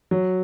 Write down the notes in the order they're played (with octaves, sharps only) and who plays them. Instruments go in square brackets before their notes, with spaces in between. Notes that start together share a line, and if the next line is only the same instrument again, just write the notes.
[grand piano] F#3